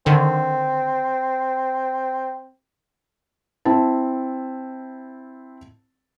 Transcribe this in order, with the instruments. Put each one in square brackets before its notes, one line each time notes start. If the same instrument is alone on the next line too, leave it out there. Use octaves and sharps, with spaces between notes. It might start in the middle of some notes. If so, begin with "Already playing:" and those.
[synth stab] D3 D#3 [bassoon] C4
[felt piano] C4 E4 A5